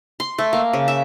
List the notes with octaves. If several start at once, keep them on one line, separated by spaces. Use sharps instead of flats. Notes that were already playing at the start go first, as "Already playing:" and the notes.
C6
A3
A#3
C#3
E5